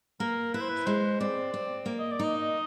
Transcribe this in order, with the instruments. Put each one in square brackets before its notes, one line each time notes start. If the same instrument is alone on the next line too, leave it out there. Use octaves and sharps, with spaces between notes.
[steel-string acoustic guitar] A#3 [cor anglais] A#4
[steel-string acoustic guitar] E4 [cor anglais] B4
[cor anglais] C5
B4
[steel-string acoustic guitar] G#3 [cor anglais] C5
[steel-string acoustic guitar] C4 [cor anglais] D5
[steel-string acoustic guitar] C4
A#3
[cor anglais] D#5
D5
[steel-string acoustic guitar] D#4 [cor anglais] D#5